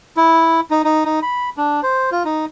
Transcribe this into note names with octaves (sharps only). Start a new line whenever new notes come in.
E4
D#4
D#4
D#4
B5
D4
C5
F4
D#4